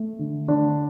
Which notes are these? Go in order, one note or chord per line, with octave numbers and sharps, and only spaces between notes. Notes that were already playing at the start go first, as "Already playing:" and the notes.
Already playing: A3
D3
D3 D4